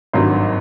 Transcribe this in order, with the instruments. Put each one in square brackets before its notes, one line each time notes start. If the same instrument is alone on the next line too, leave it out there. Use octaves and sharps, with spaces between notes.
[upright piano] G#1 G2 D#3 F#3 C6